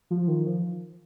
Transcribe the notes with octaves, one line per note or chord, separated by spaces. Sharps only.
F3
D#3
F3